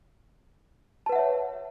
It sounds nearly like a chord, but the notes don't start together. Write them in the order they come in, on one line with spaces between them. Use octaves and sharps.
A5 B4 F#5 E5 C#5